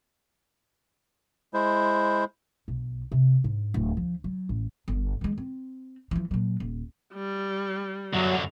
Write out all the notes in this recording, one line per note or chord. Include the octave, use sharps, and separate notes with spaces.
G#3 E4 C5
B1
C3
G#2
D1
F3
F#3
A1
G1
D#3 G#3
C4
E3 F3
A#2 F#3
D#1
G3
F#2 D3 F#3